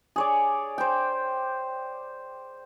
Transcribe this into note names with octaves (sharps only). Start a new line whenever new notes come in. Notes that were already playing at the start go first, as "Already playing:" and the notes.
G#4 C#5 D5
C5 G5